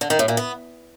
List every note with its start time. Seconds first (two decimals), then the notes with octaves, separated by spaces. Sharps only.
0.01 D3
0.10 D#3
0.19 A2
0.28 A#2
0.37 B3